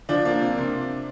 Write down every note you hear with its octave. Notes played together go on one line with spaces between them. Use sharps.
F3 D4
A#3
C3
C3